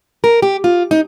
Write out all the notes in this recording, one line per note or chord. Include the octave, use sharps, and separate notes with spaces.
A#4
G4
F4
D#4